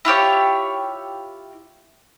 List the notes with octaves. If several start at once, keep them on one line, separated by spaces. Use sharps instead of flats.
E4 F4 G4 C#5